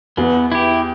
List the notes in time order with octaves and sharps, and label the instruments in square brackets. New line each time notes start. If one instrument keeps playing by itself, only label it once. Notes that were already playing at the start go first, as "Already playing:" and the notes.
[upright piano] E2 [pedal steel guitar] B3
[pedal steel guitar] E4 G4